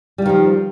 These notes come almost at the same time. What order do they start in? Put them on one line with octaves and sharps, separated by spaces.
G3 F4 D#3 F3